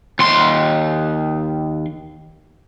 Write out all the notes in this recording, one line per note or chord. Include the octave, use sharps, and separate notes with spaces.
D#2 C6